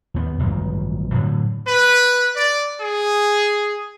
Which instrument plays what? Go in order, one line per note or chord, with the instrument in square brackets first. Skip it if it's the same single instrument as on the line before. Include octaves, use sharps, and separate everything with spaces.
[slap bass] D#2 B3
A1 G2 D#3 F#3
A2 D3 F#3
[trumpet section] B4
D5
G#4